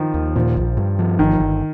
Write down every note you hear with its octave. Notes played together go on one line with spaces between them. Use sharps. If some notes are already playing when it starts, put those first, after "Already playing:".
Already playing: D#3 F3
D#2
A#2 F3
A#1
G2
F3
G1 D#3
G1